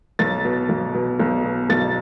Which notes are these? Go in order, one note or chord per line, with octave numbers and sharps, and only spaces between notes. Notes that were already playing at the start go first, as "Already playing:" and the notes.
B1 A6
B2
B1
B2
B1
B2
B1 A6